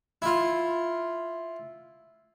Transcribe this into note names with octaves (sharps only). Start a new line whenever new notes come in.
E4 F4